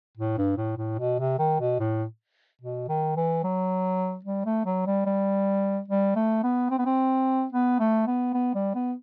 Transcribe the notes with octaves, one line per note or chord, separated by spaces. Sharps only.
A2
G2
A2
A2
B2
C3
D#3
B2
A2
B2
D#3
E3
F#3
G3
A3
F#3
G3
G3
G3
A3
B3
C4
B3
C4
B3
A3
B3
B3
G3
B3